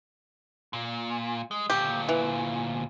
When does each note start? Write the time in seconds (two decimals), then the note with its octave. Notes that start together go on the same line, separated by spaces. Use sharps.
0.73 A#2
1.51 G#3
1.70 D2 A#2 G4
2.09 E3